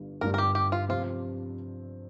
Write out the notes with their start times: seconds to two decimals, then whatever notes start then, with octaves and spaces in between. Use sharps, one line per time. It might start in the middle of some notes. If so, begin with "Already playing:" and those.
Already playing: G1 G2 G3
0.21 G1 G2 G3 A#4
0.34 A#4
0.38 G4
0.55 G4
0.72 F4
0.89 C3 F3 C4 F4 G4